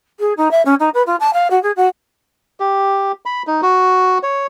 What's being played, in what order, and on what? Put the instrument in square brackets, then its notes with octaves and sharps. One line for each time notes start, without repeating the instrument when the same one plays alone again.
[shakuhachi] G#4
D#4
E5
C#4
D#4
B4
F4
A5
F5
F#4
G#4
F#4
[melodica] G4
B5
D#4
F#4
C#5